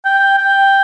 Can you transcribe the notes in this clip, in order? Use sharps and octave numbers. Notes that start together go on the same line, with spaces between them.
G5
G5